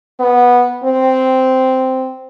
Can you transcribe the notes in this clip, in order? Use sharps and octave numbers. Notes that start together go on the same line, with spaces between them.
B3
C4